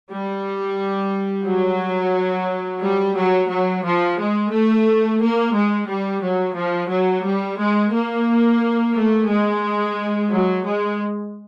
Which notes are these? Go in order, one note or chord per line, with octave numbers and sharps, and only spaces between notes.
G3
F#3
G3
F#3
F#3
F3
G#3
A3
A#3
G#3
G3
F#3
F3
F#3
G3
G#3
A#3
A3
G#3
F#3
G#3